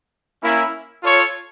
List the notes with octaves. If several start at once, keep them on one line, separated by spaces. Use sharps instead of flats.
A#3 C#4 E4
F4 A4 C#5